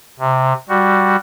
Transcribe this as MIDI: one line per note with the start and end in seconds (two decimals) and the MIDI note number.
0.20 0.53 48
0.69 1.16 55
0.69 1.16 66